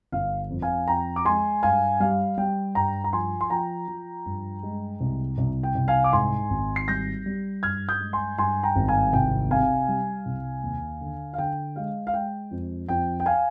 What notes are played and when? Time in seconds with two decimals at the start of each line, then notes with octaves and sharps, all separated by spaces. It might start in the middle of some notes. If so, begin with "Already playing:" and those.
0.12 G1 F5
0.50 F2
0.62 F5 G#5
0.88 F2 G5 A#5
1.16 D6
1.25 G#3 G#5 C6
1.63 G2 F5 G#5
2.00 G3 F5
2.38 G3 G5
2.75 G2 G5 A#5
3.04 A#5
3.13 F3 G#5 C6
3.41 C6
3.50 F3 G5 A#5
3.88 F3
4.26 G2
4.63 G#3
5.01 C2
5.38 C2
5.63 G5
5.75 C2
5.88 F5 G#5
6.04 D6
6.13 G#2 G#5 C6
6.50 G#1
6.76 C7
6.88 G3 G6 A#6
7.26 G3
7.63 G2 F6 G#6
7.89 D#6 G6
8.00 G#3
8.13 G#5 C6
8.38 G2 G#5 C6
8.63 G5 A#5
8.76 G#1
8.88 F5 G#5
9.13 C2 G5
9.51 C3 F5 G#5
9.88 G3
10.26 C2
10.64 D#2
11.01 D3
11.34 F5
11.38 D3 G5
11.76 G#3 F5
12.07 F5
12.14 G#3 G5
12.51 F2
12.88 F2 G5
13.20 G5
13.26 F5 G#5